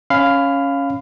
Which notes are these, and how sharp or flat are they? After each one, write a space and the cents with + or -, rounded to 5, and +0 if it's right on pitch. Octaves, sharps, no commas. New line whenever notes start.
C#4 +0 F5 +0 B5 +25